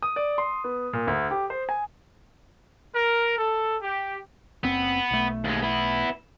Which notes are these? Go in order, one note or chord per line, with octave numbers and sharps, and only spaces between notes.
D#6
D5
C6
B3
A#2
D2
G4
C5
G#5
A#4
A4
G4
F#1 B3 C4
B1 A3
D#2 G#3
B3 E4